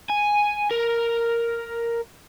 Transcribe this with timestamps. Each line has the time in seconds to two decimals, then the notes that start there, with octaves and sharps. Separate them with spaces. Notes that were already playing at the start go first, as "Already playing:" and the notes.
0.09 G#5
0.71 A#4